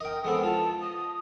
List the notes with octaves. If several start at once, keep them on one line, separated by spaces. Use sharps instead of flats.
A#4 D#5 G5
G#3 B3 C4 A4
F4 A5
D#6